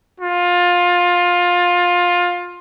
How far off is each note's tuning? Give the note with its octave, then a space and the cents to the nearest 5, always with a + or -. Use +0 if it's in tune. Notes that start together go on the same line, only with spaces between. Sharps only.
F4 +20